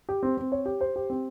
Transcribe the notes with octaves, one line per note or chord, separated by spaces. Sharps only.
G4
C4
C4
C#5
G4
C5
G4
C4